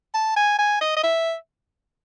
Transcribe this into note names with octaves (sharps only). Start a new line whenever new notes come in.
A5
G#5
G#5
D#5
D#5
E5